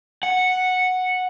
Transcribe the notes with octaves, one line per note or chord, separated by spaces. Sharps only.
F#5